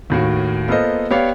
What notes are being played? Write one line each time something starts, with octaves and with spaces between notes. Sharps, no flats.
D#2 A2 F#4
A#3 B3 F4 A4 C5 D#5
B3 G4 C#5 D5 F5